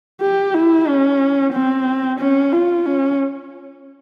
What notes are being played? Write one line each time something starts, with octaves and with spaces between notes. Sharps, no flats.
G4
E4
C#4
C4
C#4
F4
C#4